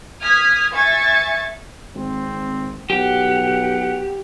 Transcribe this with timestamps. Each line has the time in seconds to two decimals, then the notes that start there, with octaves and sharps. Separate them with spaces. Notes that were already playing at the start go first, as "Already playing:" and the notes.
0.20 D#6 F6 G#6 B6
0.73 E5 G#5 C#6 G#6 A6
1.95 G#1 C4
2.90 B1 G4 F#5